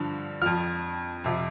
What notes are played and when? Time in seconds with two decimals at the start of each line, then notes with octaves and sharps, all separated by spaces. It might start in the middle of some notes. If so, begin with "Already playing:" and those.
Already playing: G2 D3 F3
0.41 F2 F3 F6
1.24 F2 C3 F3